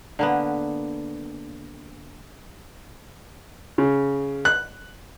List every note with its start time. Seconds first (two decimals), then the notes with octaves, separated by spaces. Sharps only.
0.19 D3 A#3 B3
3.78 C#3
4.45 F#6